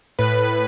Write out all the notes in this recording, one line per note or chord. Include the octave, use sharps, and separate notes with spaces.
A2 B4